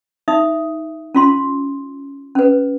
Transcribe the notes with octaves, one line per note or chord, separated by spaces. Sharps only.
D#4 E5 D#6
C#4 F4 C6
C#4 B4